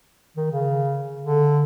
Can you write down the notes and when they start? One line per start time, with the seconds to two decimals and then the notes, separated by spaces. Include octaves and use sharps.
0.37 D#3
0.51 C#3
1.22 D3